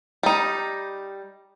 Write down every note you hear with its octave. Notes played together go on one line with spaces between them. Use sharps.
G3 D#4